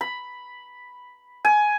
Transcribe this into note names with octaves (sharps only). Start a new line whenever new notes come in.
B5
G#5